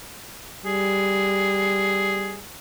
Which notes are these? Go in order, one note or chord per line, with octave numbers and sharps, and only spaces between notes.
G3 G#4